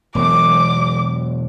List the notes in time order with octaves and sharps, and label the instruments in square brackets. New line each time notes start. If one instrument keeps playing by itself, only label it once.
[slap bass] E1 F#3 [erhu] D6